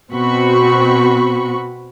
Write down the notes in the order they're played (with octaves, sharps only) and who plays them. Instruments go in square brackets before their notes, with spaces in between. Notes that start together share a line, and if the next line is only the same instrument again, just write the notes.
[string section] B2 C4 F#4 B5 C#6